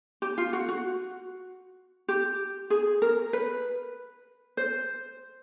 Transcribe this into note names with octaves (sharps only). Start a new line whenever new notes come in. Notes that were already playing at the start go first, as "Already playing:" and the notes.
G4
F4
F#4
F#4
G4
G#4
A#4
B4
C5